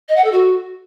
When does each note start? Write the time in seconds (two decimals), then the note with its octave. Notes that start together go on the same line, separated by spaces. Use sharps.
0.09 D#5
0.16 F#5
0.24 A4
0.32 F#4